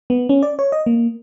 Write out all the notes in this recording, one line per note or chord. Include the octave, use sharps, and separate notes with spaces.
B3
C#4
D5
C#5
D#5
A#3